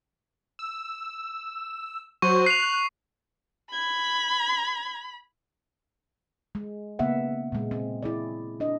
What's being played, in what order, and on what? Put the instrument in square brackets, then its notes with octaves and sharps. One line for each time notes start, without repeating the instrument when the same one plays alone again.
[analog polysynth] E6
[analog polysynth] F#3 F#4 C5 [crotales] C#6
[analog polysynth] F#6 [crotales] C7 F7
[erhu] B5 [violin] G#6
[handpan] G#3
C#3 A#3 B3 E5 F#5
A#2 G#3
C4
E4 G#4 D5
D4 D#5